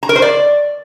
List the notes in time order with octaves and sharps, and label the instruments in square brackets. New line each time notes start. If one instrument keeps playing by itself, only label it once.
[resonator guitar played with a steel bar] A#5
A#4
C5
D5